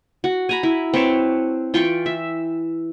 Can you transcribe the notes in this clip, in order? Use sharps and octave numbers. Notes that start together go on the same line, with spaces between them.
F#4
G#5 A#5 B5
E4
C4 B4 C#5 A5
E3 F4 G5 C#6
E5